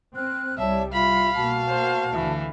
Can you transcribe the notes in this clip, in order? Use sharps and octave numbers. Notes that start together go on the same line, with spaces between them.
C4 F6 F#6
C2 G3 C#5 D5 E5 A5
F4 E5 F5 B5
B2 A#3 F#4 A5
C5
D2 D3 E3